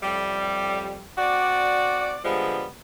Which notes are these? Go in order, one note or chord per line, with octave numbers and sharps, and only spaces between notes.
F2 A2 G3
C4 F#4 D5
D3 F3 G3 G#3 B3